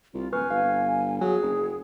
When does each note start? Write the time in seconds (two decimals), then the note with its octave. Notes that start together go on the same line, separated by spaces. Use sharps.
0.14 C2 F4
0.33 D1 B4 G#5 C#6 F6
0.51 G1 F5
1.21 F#3 G#4 G#5
1.42 F#1